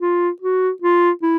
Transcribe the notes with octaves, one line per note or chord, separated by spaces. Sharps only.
F4
F#4
F4
E4